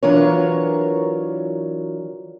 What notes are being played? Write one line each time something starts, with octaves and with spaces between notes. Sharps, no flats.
E3 F#3 D4 F4 A#4 C#5